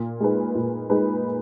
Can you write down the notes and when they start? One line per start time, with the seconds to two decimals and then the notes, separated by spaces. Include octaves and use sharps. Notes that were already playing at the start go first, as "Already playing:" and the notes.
Already playing: A#2
0.20 G#3 D#4 G#4 B4
0.55 A#2
0.90 G#3 D#4 G#4 B4